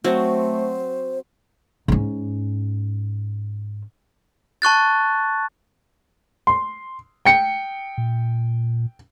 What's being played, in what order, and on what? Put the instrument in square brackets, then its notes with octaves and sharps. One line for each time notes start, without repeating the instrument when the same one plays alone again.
[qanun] F#3 C4 [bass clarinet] A3 [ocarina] C5
[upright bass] G#2 C#4
[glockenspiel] A5 C#6 F#6 A6
[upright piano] C6
G5 C#7
[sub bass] A#2